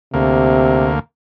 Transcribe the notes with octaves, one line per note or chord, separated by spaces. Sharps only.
D2 C3 A#3